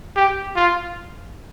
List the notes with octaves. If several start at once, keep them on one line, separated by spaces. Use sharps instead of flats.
G4
F4